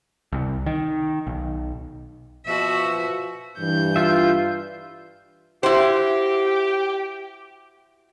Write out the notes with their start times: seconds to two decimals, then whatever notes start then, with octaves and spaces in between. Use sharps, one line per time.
0.32 C2
0.66 D#3
1.27 B1
2.46 B2 F3 F#4 E5
3.59 G2 E3 G6
3.96 F4 E5
5.63 E4 F#4 G4 C5